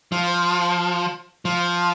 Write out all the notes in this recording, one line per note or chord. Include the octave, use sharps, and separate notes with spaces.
F3
F3